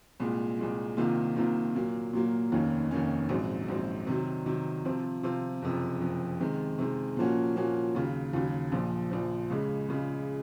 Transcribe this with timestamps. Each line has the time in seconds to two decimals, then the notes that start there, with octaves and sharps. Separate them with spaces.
0.20 C2 A#2 G#3
0.59 C2 A#2 G#3
0.97 C2 C3 D#3 A#3 F4
1.36 C2 C3 D#3 A#3 F4
1.75 A#2 F#3 A#3
2.13 A#2 F#3 A#3
2.52 F1 D#2 D#3 A#3 C#4
2.91 F1 D#2 D#3 A#3 C#4
3.29 A#1 G#2 F#3 C4
3.68 A#1 G#2 F#3 C4
4.07 C3 D#3 F#3
4.46 C3 D#3 F#3
4.85 C3 F3 C4 F4
5.23 C3 F3 C4 F4
5.62 F#1 F2 C3
6.01 F#1 F2 C3
6.40 C3 D#3 G#3
6.79 C3 D#3 G#3
7.17 A#2 F3 A#3 C#4 F#4
7.56 A#2 F3 A#3 C#4 F#4
7.95 D#2 C#3 F#3
8.33 D#2 C#3 F#3
8.72 A#1 A#2 F3
9.11 A#1 A#2 F3
9.50 C#2 C#3 G#3
9.88 C#2 C#3 G#3